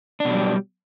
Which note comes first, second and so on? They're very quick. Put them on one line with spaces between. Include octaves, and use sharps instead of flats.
D4 B2 F#3 G3